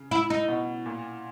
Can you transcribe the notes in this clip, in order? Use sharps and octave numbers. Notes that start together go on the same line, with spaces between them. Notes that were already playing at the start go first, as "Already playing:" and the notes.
Already playing: C#3
E4
D#4
B2
A#2